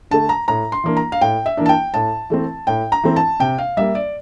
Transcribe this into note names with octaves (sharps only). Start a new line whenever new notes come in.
D3 A3 A5
A#5
A2 A#5
C6
E3 A#3 D4
A#5
F5
A2 G5
E5
E3 A#3 D4
A5
G5
A2 A5
E3 A3 C4
A2 G5
A#5
E3 A3 C4
A5
C3 G5
F5
G3 A#3 E5
D5